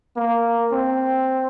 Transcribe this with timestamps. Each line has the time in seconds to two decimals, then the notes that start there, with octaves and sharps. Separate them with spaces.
0.16 A#3
0.72 C4